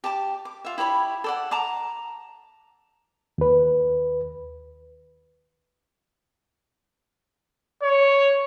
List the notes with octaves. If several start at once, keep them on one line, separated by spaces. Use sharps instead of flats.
G4 A5 D6
D6
F4 E5
E4 G4 C#5 B5
A4 D5 F#5
A5 A#5 D6
D#2 B4
C#5